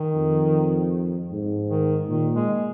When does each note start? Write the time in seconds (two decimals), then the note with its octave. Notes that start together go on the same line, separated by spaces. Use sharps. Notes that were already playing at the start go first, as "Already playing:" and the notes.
Already playing: D#3
0.15 F2
1.32 G#2
1.70 D#3
2.08 A#2 D#3
2.35 G#3